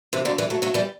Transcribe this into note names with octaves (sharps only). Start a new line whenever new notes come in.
C3 E3
D3 F#3
E3 G3
F#3 A3
F#3 A3
E3 G3